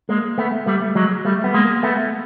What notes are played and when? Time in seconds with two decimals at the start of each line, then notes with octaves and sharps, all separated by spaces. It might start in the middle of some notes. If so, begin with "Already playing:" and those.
0.09 G#3 A#3
0.38 A3 B3
0.66 G3 A3
0.95 F#3 G#3
1.25 G3 A3
1.44 B3
1.54 G#3 A#3
1.83 A3 B3